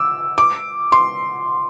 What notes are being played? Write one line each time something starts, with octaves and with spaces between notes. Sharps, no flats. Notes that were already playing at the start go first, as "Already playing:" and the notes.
Already playing: D6 E6
D6
C6